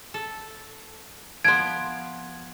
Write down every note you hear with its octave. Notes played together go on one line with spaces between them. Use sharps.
A4
F3 B3 C6 G#6 D7